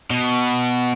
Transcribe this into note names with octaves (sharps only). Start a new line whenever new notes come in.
B2